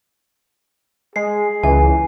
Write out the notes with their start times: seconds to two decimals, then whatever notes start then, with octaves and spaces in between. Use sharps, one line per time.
1.16 G#3 G#4 C7
1.63 C#2 E3 G#5